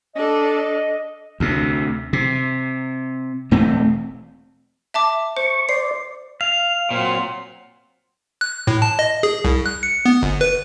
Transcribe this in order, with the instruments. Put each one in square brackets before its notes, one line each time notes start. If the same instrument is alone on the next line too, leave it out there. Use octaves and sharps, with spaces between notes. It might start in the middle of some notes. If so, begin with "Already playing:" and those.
[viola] D4 A4 [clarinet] D#5
[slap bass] D2 C3
C3
E1 A3 C4
[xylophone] E5 A5 D6
[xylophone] C5 [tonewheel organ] C#6
[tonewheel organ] C5 D5 [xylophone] C7
[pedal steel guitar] F5 [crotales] F7
[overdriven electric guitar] A#2 [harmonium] F#3 C4 C5
[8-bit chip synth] F#6
A2
A5
D#5
G#4
C2
F#6
C#7
B3
G1
B4